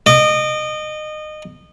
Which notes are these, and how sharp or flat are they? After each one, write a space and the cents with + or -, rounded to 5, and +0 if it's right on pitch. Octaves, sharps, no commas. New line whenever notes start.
D#5 -25 D6 +0